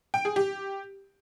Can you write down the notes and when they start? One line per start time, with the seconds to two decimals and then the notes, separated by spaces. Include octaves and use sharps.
0.14 G5
0.25 G#4
0.36 G4